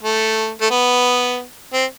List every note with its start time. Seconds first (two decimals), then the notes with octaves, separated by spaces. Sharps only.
0.03 A3
0.61 A3
0.70 B3
1.73 C4